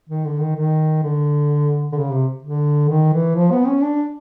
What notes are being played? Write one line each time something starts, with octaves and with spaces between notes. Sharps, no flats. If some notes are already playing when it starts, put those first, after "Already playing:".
D#3
D3
D#3
D#3
D3
D3
C#3
C3
D3
D#3
E3
F3
B3
C#4
D4